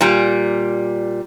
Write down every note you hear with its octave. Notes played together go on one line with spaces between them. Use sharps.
A#2 G3